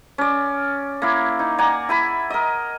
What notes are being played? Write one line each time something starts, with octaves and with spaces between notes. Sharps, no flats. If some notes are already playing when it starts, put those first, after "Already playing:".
C#4 D5
A#3 E4
D#4
D5 F#5 G#5 A#5
E4 G#5 B5
A#4 D#5